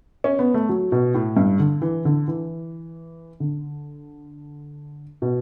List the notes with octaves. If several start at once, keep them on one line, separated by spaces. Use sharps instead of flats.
C#4
B3
A3
F#3
B2
A2
G2
D3
E3
D3
E3
D3
B2